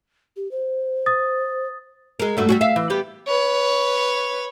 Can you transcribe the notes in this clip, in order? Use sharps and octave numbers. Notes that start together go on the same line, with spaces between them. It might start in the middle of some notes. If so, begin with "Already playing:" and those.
G4
C5
D#6 A6
G#3 A#4
G2 A3 F#4
G3 C#4 F#4
E5 F5
E3
G3 B3 G4
B4 C#5